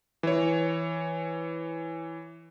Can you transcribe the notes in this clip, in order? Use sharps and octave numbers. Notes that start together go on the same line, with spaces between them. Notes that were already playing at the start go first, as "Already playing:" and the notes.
E3 C#5